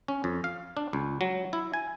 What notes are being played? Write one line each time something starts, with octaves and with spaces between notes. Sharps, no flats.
C#4
F2
F5
D4
C#2
F#3
E4
G#5